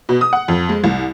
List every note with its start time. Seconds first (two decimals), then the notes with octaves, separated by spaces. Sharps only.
0.09 B2
0.21 D#6
0.33 F#5
0.48 F2
0.69 G#3
0.84 C2